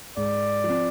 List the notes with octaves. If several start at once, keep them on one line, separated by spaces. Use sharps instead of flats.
G#2 D5
F3
C4